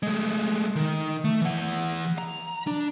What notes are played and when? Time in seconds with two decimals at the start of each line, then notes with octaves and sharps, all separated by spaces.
0.03 G#3 A3
0.76 D#3
1.24 A3
1.42 E3 F#5
2.18 A#5
2.67 D4